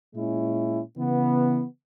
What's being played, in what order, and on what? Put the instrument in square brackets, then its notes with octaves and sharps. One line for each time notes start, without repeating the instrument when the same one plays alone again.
[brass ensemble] A#2 G#3 C#4 E4
C#3 E3 B3